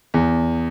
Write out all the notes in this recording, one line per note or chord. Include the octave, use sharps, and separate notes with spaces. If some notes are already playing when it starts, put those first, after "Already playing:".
E2